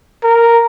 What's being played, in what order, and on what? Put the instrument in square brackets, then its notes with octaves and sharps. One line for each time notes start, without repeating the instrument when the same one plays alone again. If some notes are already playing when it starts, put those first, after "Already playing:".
[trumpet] A#4